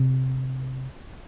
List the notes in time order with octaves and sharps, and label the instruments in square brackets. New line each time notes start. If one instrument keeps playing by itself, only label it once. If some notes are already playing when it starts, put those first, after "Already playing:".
Already playing: [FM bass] C3